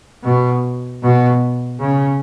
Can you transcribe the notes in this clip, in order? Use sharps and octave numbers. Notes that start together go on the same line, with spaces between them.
B2
B2
C#3